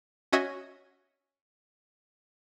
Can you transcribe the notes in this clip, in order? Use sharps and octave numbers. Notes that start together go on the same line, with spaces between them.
C#4 F#4 D#5 E5 G#5